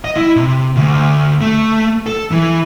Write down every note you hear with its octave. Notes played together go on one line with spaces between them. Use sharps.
D#5
E4
C3
D2
A3
A4
E3